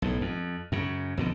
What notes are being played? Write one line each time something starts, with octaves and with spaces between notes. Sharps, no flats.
B1 A2
F2
F#2 C#3
F2 B2 D3